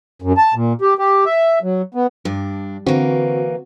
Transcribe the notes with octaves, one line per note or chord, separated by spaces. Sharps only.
F#2
A5
A#2
G4
G4
E5
F#3
B3
G2 D4
D3 E3 A#3 C4 F#4